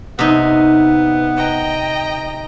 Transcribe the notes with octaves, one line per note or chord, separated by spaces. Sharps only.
C3 B3 D#4
D#5 G5 A#5